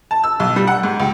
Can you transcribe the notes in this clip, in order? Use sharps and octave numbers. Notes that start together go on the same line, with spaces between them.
A5
E6
B1
G3
F#5
G#2
C#2